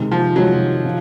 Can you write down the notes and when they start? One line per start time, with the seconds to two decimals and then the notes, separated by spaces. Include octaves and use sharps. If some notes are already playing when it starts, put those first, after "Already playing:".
Already playing: C3 D#3 G#3
0.12 F3
0.36 C3 D#3 F#3 G#3
0.85 F3